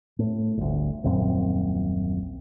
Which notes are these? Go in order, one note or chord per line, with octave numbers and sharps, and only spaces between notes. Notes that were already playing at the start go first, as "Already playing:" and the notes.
A2
G1 D2
D#1 A#1 F#2 C4